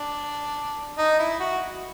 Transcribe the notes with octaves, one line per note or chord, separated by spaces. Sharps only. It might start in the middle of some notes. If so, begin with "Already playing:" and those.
Already playing: D4
D#4
E4
F#4